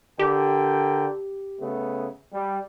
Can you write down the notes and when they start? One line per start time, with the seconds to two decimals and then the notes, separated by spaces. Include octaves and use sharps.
0.19 D3 G4 A#4 G5
1.61 C#3 A3 B3
2.33 G3